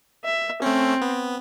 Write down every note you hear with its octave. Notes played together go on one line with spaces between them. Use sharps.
E5
A3 C4 C#4
B3